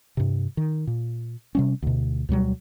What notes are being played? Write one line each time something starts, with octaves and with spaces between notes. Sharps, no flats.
G2 C3
D#3
A#2
C3 G3 C#4
D2 B2
D2 B2 F#3 G3